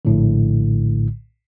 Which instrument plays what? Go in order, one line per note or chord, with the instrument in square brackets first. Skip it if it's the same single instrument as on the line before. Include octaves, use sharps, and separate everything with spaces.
[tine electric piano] A#1 A2 D3